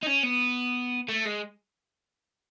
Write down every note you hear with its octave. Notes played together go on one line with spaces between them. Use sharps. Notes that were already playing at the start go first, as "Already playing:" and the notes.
D#4
C#4
B3
A3
G#3